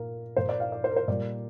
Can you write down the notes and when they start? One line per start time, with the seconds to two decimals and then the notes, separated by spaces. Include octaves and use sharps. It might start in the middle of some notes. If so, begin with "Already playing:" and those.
Already playing: A#2 A#3 A#4
0.36 A#2 A#3 C5
0.49 D5
0.60 F5
0.72 D5
0.84 C5
0.91 A#4
0.96 C5
1.08 A#2 G3 A#3 D5